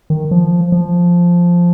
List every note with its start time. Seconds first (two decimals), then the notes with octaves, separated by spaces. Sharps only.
0.10 D#3
0.31 F3
0.72 F3